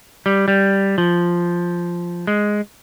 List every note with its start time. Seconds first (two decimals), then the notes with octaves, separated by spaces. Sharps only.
0.26 G3
0.48 G3
0.98 F3
2.27 G#3